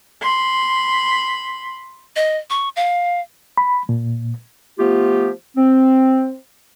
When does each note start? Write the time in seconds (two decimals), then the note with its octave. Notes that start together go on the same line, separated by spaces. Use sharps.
0.22 B5 C6
2.16 D#5
2.50 C#6
2.76 F5
3.57 B5
3.89 A#2
4.79 F3 A3 B3 F4 G4
5.57 C4